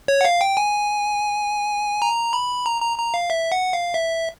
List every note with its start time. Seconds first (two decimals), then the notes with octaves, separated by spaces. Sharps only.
0.08 C#5
0.21 F#5
0.25 F5
0.41 G5
0.57 G#5
2.02 A#5
2.33 B5
2.66 A#5
2.82 A#5
2.98 A#5
3.14 F5
3.30 E5
3.52 F#5
3.73 F5
3.94 E5